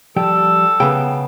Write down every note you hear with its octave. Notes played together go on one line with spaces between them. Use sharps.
F3 G3 A4 G5
C#3 B3 G5